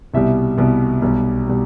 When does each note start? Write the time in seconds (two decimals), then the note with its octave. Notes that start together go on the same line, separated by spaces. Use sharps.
0.14 C2 B2 G3 E5
0.58 C2 B2 G3
1.02 B1 B2 G3
1.47 B2 G3